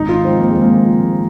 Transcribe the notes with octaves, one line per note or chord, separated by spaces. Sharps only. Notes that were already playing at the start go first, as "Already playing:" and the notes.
Already playing: G#1 D#4
F4
G#2 F3 C4
A#3
G#1 G#3
A#3
G#2 F3